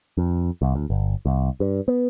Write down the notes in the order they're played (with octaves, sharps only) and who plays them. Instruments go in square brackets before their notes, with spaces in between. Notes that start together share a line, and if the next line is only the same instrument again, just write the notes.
[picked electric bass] F2
C2
D2
G1
C2
G2
B3